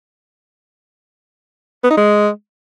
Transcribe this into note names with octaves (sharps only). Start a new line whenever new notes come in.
B3
D#4
G#3